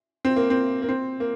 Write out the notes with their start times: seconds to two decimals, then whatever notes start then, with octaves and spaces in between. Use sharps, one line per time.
0.25 C4
0.36 A#3
0.50 C4
0.82 A#3
0.89 C4
1.20 A#3